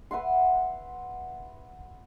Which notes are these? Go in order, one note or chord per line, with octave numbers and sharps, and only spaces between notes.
B4 E5 F#5 C6